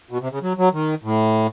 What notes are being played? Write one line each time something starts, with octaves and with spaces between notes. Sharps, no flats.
B2
C3
C#3
F#3
F#3
D#3
A2